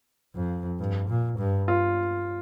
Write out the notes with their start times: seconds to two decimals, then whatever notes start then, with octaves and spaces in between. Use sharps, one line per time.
0.35 F2
0.79 G2
1.09 A#2
1.39 G2
1.68 F4